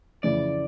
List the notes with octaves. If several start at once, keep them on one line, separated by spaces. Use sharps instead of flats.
F2 C#3 E3 D5